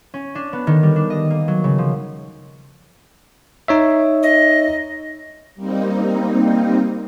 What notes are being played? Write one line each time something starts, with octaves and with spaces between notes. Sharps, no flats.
C#4
D4
B3
D#3
G3
D4
D#5
A#3
F#3
C#3
F3
D#4 C#5 E5
D#5
G3 A#3 C4 D#4